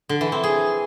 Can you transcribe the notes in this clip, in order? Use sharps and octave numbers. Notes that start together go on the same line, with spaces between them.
D3
E3
C4
G#4